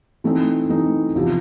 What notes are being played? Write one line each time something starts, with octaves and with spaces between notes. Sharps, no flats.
E3 A3 C4 D#4
E3 A3 C4 D#4
E2 C3 F3